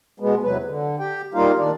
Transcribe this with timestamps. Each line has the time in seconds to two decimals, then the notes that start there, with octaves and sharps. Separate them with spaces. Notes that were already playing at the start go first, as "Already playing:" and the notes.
0.20 B2 G#3 B3
0.43 E2 C3 F#3 B4
0.65 D3
0.99 G4 G5
1.34 G3 A#3 D#4 F4 F5
1.59 A#2 D#3 D4 D5